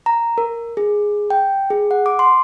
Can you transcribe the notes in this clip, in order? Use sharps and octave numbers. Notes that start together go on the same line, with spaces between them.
A#5
A#4
G#4
G5
G#4
F#5
D6
C6